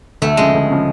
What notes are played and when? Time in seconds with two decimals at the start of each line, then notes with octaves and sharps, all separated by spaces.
0.22 D2 A3
0.37 C#3 F3 G#3
0.54 D2
0.70 C#3 F3